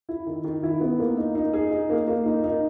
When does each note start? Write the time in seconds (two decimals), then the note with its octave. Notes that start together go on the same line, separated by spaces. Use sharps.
0.09 E4
0.27 D#3
0.44 D#3
0.63 E4
0.81 B3
1.00 A#3
1.17 D#4
1.35 D#4
1.53 G#4
1.71 D#4
1.90 A#3
2.08 A#3
2.26 D#4
2.44 D#4